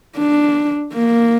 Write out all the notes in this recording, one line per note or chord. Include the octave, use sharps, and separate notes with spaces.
D4
A#3